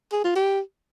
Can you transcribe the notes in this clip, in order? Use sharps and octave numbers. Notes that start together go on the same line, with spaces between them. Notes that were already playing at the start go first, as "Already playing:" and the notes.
G#4
F4
G4